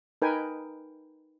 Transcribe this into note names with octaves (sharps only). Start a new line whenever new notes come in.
D#4 A#4 B4 G5 G#5